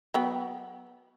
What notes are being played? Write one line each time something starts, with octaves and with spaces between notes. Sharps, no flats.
F#3 B3 G5